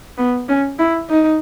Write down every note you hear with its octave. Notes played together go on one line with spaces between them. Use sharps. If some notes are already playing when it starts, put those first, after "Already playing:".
B3
C#4
E4
D#4